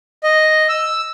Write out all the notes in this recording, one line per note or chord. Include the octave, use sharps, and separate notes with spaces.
D#5
E6